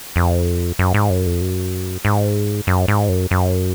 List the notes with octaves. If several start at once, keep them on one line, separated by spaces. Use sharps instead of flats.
F2
F#2
G#2
F#2
F2
F#2
G#2
F#2
G#2
F#2
F#2